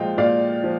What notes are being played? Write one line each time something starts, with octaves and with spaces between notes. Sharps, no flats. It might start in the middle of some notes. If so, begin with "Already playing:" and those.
Already playing: A#2 F3 G#3 D#5 F5 G5
A#2 D5 F5
F3